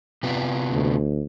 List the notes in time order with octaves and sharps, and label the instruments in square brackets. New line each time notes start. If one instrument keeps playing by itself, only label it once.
[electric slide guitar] C3 B3 F4
[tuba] D2